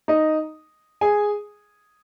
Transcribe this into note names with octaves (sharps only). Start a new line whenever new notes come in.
D#4 D#5
G#4 G#5